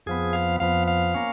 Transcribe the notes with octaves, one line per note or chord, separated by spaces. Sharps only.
F2 F3 B3 G#4
F5
F2 F3 B3 F5
F5
A#3 C#4